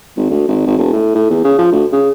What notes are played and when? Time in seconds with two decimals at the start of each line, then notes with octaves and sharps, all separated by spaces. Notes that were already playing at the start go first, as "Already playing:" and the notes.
0.17 G#1
0.30 D2
0.48 G#1
0.66 G#1
0.78 E1
0.93 A2
1.15 A2
1.30 E2
1.44 C#3
1.58 F3
1.72 D2
1.92 C#3